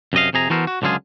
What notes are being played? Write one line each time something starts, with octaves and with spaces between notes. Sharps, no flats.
F#2 C3 D#5 F5
F2 C3 G#4 A#5
E3 B3 F#4 A4 A#4 C5
F#4
C#2 D3 F#3 F4 G#4